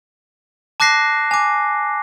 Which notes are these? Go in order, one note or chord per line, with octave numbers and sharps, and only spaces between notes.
A5 D6 F#6 A#6 C7
G#5 D6